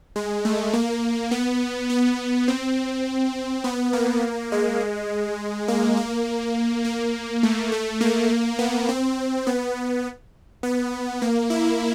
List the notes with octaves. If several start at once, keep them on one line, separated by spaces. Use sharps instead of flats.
G#3
A3
A#3
B3
B3
C4
B3
A#3
G#3
A#3
A#3
A#3
A3
A3
A#3
B3
C4
B3
B3
A#3
E4